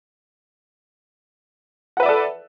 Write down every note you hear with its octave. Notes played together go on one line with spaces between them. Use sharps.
A4 B4 D5 E5 F#5